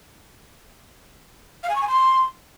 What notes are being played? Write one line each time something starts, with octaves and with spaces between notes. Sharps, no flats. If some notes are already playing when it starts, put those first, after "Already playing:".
F5
G#5
C#6
G#5
C6